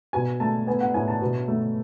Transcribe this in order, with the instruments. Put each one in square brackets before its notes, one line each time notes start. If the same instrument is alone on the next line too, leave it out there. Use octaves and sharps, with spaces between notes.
[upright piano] B2 G#5
A3 A5
B3 G#5
F#5
A2 G#5
A5
B2
A3